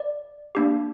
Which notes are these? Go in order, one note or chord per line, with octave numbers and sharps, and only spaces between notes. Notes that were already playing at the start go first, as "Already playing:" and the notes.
Already playing: D5
A#3 D4 G4